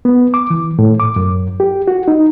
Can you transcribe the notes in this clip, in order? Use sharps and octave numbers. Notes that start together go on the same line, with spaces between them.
B3
D6
E3
A2
D6
F#2
G4
F#4
D#4